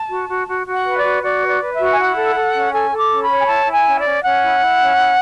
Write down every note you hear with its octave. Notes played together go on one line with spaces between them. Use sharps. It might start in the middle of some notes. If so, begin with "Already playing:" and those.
Already playing: A5
F#4
F#4
F#4
F#4
F#5
B4
D5
F#4
F#4 D5
B4
D5
B4
E5
F#4
G#5
E4 F#5
A4
A4
C#4
A4 G#5
A4
D6
C#4
B5
C#5
G#5
E4 A5
E4
G#5
C#4
D5
C#4
C#4 F#5
E4
E4
C#4
E4